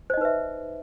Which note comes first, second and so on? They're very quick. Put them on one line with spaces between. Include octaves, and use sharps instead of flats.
C5 D#5 D#4 B4 E5